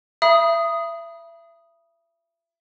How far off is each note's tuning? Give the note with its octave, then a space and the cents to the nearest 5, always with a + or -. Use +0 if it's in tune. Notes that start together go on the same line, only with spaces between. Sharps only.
E5 +30 B5 -35 D#6 +0